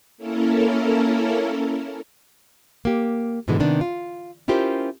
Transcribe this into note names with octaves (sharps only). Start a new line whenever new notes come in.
A#3 C#4 E4 A4 A#4
A#3 G4
G#2 B2 D3 E3 G#3
C3 D#3 B3 D4
F4
C#4 E4 F4 G4 A#4 C5